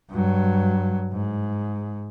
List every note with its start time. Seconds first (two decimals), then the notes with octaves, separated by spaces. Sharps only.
0.10 G2 F#3
1.13 G#2